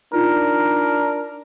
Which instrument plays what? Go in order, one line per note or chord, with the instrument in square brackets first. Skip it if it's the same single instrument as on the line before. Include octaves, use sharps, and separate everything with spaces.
[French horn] D4 [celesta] D#4 F4 [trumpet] A#4